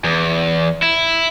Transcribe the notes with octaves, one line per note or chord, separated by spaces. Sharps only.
E2
E4